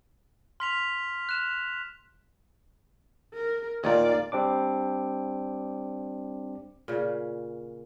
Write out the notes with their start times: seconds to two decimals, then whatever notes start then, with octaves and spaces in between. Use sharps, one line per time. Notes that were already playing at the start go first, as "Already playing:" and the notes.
0.60 C6 F6 B6 F7
1.29 F#6 E7
3.34 A#4
3.84 D#2 A#2 D5 F5
4.32 G3 C4 D4 D6
6.88 A#2 C#3